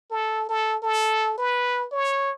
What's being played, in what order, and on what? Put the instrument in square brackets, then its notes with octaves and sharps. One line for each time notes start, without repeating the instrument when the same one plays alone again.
[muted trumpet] A4
A4
A4
B4
C#5